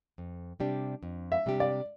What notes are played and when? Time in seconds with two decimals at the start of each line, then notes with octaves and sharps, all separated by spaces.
0.18 F2
0.60 C3 G3 D4 G4
1.03 F2
1.32 E5
1.46 C3 G3 D4 G4
1.60 D5